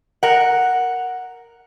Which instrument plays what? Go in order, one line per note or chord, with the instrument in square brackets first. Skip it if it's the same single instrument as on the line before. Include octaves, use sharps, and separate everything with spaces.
[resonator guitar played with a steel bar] A#4 F#5